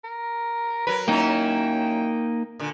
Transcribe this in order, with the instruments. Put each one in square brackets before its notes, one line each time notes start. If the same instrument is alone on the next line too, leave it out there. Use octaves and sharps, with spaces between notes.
[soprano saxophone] A#4
[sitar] F#3 A#4 [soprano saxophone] B4
[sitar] F#3 C#4 E4 [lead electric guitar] A#3 D#4 [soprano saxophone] G5
[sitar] A#2 D3